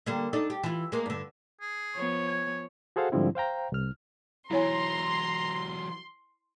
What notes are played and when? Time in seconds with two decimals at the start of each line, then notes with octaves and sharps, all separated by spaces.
0.06 D3 G3 A#3
0.33 D4 D#4 A4
0.50 G4
0.63 E3 F4
0.92 G#3 A#3
1.06 G2 D3
1.61 G#4
1.96 F3 B3 C#5
2.27 G#5
2.96 F#4 G#4 A4 C5 F5 F#5
3.12 G#2 D3 F3 G3 C4 E4
3.35 C5 F5 G5 A#5
3.72 C2 F6
4.51 E3 F#3 E4 C#5 G#5 A#5 C6